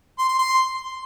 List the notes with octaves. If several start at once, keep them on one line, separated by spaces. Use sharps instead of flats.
C6
C6
C6